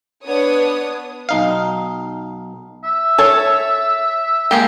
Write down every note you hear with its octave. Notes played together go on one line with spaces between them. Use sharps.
B3 D4 C#5 D#6
B1 D#4 F5
E5
A4 C#5
G#3 A#3 G4